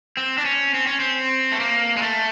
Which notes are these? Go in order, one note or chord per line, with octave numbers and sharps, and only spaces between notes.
C4
D4
C#4
C4
C#4
C4
A3
A#3
G#3
A3